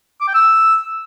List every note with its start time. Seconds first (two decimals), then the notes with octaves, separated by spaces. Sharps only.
0.21 D6
0.27 G5
0.34 E6